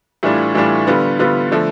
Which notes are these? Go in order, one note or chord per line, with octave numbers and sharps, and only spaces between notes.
A2 E3 G3 D4 F4
A2 E3 G3 D4 F4
D3 G3 B3 F4
D3 G3 B3 F4
D3 F3 A3